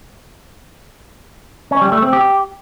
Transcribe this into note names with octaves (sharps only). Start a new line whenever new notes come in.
C#4
G3
A3
C4
G4